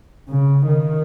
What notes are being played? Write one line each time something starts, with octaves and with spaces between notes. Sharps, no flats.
C#3
D#3